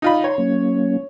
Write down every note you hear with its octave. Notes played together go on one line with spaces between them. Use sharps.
D#4 F4 D5 B5
C#5 A#5 C6
F#3 A#3 C#4